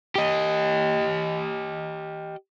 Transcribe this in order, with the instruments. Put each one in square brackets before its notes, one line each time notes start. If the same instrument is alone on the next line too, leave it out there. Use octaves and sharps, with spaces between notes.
[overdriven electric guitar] G4 D#5